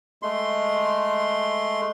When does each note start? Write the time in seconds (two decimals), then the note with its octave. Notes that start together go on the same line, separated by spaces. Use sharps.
0.23 G#3 A3 C6